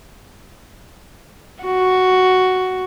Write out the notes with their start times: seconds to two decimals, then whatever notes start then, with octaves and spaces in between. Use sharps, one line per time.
1.63 F#4